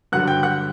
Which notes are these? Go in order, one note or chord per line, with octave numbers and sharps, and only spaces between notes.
G2 D3 F#3 F#5 F#6
G5 G6
F#5 F#6